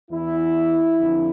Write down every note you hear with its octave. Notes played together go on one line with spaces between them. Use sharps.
E2 E3 E4
F2 D3 F3